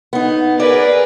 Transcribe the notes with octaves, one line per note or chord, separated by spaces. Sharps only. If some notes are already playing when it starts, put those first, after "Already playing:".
B3 D#4
G#4 A#4 B4 D5